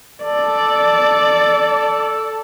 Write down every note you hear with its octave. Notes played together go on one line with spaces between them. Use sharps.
A4 D5